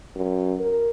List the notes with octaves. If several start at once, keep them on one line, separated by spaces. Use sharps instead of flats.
F#2
A#4